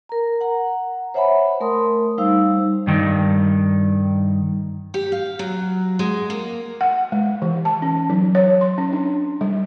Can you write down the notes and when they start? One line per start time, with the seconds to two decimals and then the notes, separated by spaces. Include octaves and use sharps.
0.09 A#4 A#5
0.41 F#5 A#5
1.14 C5 C#5 E5 F#5 G#5 B5
1.60 A3 A#4 C6 D#6
2.18 G3 D#4 C5 F5 E6
2.87 G2 D#3
4.94 G4
5.12 F5
5.39 F#3
5.99 G#3
6.30 A#3
6.81 F#5
7.12 G#3
7.42 E3
7.65 A5
7.82 C#4
8.10 F#3
8.35 C#5
8.61 C6
8.78 C#4
8.93 D4
9.41 G3